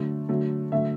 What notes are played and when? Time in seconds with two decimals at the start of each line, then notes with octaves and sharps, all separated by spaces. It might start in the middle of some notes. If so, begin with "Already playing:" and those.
Already playing: D3 F#3 A3
0.29 D3 F#3 A3
0.72 D3 F#3 A3 E5